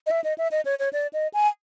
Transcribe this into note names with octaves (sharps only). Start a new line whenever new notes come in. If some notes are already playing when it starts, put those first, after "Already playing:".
D#5
E5
D#5
E5
D#5
C#5
C#5
D5
D#5
G#5